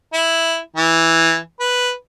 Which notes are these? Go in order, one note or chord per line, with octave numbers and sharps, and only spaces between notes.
E4
E3
B4